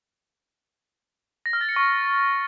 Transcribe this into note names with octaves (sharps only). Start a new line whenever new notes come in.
A#6
F6
A6
C#7
C#6